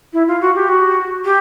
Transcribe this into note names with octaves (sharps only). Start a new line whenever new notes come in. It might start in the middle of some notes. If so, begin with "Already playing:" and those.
E4
F4
F#4
G4
F#4
G4